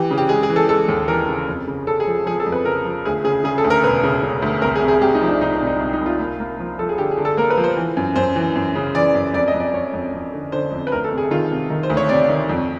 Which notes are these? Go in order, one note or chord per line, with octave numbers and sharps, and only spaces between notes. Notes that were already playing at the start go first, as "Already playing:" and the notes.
Already playing: E3 G4
C#3
G4
G#3 G#4
G#4
E3
A4
G#3 A4
D#2
E3 A#4
C#3
F2
C#3
C#3 A4
G#4
F3
F3 G#4
A4
F2
B4
C#3 A#4
F3
D2 G#4
C#3 G#4
C#3 G#4
A4
D2
A#4
E1 B4
C#3
C#3
D2
C2 A#4
G#4
C3
G#4
C2 G4
D#4
F3
D4
C2 D#4
D4
C2
D#4
C2
D#4
C2
F4
A#3
A#3
F3
F3 A4
G#4
D3 G4
G#4
D3
A4
A#3 A#4
B4
F3
C5
E3
F#2
F#2 C5
E3
F#2
C#3
E3 D5
F#2
F2 D5
D#5
F2
D5
F2 C#5
F2
F2
D3
D3 C5
F2
B4
D2 A#4
A4
C3
G#4
D#3 F4
C3
D#3
C5
D2
C#5
C3 D5
D#3
F2